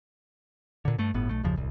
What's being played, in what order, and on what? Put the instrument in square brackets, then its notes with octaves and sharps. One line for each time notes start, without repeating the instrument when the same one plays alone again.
[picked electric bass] A#2 D3
G2 A3
G1 A2 B3
B1 A3
F#1 D#2 C#3 F3
D1 C2